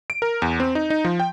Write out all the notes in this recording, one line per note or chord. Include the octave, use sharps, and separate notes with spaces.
D7
A#4
E2
C4
D#4
D#4
F3
G5